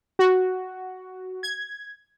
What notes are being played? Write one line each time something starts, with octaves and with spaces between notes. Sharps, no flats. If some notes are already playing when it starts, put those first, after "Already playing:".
F#4
G#6